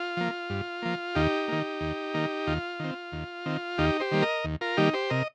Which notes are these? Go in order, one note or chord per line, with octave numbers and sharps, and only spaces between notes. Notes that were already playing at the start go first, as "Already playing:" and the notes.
Already playing: F4
F3 A#3
G2
F3 A#3
D#2 D#4 G4
D#3 A#3
D#2
D#3 A#3
D#2 F4
D#3 C4
D#2
D#3 C4
D#2 D#4 G4
G4 C5
D#3 G3 A#3
A#4 D#5
D#2
F4 A#4
D#3 G3 A#3 D#4 G4
G4 C5
C3 A#4 D#5